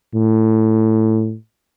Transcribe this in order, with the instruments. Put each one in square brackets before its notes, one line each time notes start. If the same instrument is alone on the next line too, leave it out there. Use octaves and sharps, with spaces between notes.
[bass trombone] A2